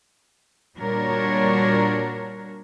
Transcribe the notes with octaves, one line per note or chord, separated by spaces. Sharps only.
A#2 G3 D4 F#4 A#4 C#5